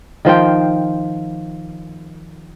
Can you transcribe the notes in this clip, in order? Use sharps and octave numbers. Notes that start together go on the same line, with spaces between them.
D#3 F3 C5 G5